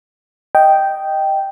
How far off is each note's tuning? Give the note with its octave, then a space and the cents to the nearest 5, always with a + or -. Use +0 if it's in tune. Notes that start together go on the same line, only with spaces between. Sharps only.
D#5 +0 G5 -5